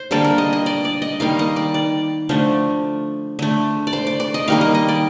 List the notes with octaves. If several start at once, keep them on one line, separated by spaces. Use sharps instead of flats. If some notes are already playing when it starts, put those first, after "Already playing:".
Already playing: C5
D3 G3 A#3 A4
A#4
D#5
D#5
D5
D5
D#5
D#3 G3 A#3 F5
D#5
D5
D5
D3 F3 A3
D3 A3
D5
C5
D5
D5
D#5
D#3 G3 A#3 F5
D#5
D#5
D5